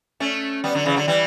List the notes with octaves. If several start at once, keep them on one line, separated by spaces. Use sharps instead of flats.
A3 C#4
G3 B3
D3 F#3
C#3 E3
D3 F#3
E3 G3